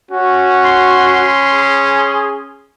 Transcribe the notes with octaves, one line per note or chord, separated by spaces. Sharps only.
C#4 F#4
C6
G#4